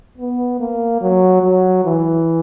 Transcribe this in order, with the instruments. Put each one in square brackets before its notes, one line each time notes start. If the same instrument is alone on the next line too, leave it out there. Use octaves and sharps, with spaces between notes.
[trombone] B3
A#3
F#3
F#3
E3